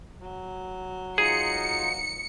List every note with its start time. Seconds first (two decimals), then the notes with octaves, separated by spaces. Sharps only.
0.22 F#3
1.18 D#4 F4 G#4 C#7